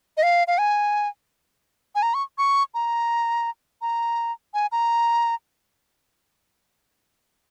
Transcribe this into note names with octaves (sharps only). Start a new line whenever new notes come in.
D#5
F5
F5
G#5
G#5
A#5
C#6
C#6
A#5
A#5
G#5
A#5